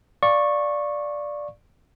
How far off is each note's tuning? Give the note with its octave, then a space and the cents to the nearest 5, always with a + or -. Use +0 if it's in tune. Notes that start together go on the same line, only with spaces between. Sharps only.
D5 +0 F5 +0 C#6 -15